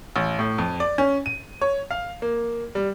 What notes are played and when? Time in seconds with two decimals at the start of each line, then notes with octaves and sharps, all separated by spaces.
0.16 A1
0.39 A2
0.58 F2
0.80 D5
0.98 C#4
1.26 D#7
1.62 C#5
1.91 F5
2.22 A#3
2.75 G3